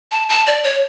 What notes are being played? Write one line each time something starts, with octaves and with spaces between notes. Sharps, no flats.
A5
A5
D5
C#5